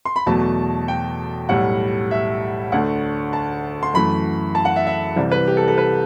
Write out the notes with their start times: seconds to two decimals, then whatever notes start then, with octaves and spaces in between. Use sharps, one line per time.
0.05 C6
0.16 B5
0.26 E2 B2 F#3 A3 A5
0.88 G5
1.49 B1 A2 G3 F#5
2.11 E5
2.72 D2 D3 A3 F#5
3.33 A5
3.83 C6
3.94 F#2 E3 A3 B5
4.55 A5
4.65 F#5
4.76 E5
4.87 E5
5.16 C2 C3 E3 G3 D5
5.32 B4
5.47 G4
5.57 A4
5.68 A4
5.78 B4